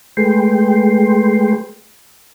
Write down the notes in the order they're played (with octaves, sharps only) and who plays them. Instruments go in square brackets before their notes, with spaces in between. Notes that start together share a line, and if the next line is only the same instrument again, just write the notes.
[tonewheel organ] G#3 A3 G#4 B4 G5 C6